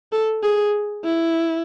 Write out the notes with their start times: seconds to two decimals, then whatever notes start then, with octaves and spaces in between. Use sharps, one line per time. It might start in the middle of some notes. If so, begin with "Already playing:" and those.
0.12 A4
0.43 G#4
1.04 E4